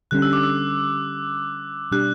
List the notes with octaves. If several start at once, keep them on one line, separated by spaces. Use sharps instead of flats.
D3 G3 C#4 F#6
E6
D6
E6
B2 G3 D4 G4 F#6